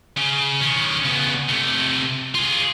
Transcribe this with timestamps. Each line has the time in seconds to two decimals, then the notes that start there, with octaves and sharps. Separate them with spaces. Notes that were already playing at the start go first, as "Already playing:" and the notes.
0.17 C#3
0.61 D#3 C#4
1.05 C#3 B3
1.49 C3 A3
2.35 F4 G#4